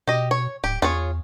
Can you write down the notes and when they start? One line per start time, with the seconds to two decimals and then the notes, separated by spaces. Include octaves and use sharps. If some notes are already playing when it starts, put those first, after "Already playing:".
0.07 B2 G4 D#5
0.31 C#5
0.64 D1 G4
0.82 E2 F4 G#4 C#5